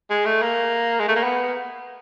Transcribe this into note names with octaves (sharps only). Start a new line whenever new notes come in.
G#3
A3
A#3
G#3
A3
A#3
B3